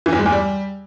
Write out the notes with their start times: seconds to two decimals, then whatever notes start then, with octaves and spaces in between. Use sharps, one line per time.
0.06 E3
0.13 E2
0.19 G#3
0.26 E2
0.32 G3